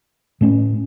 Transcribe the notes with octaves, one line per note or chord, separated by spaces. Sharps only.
A2 A3 C#4